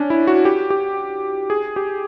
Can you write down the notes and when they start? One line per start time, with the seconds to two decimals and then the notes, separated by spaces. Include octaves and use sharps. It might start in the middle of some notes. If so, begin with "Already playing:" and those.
Already playing: C#4 D4
0.10 E4
0.27 F#4
0.45 G4
0.70 G4
1.50 G#4
1.76 G4